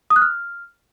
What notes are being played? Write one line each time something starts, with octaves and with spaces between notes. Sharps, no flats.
D#6
F#6
F6